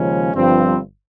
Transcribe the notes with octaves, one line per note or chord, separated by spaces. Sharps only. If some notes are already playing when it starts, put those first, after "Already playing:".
Already playing: D#2 C#3 F3 G#3 C#4
G1 G2 F3 C4